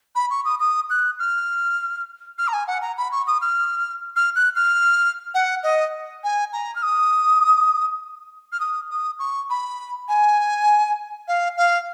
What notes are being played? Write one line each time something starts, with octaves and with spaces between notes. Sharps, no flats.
B5
C#6
D#6
D#6
F#6
F6
F6
A#5
G#5
F#5
A#5
B5
C#6
D#6
F6
F6
F#6
F6
F#5
D#5
G#5
A#5
F6
D#6
F6
D#6
D#6
C#6
B5
G#5
F5
F5